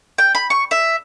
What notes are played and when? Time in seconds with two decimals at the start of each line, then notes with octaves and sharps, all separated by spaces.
0.18 G5
0.35 B5
0.50 C#6
0.71 E5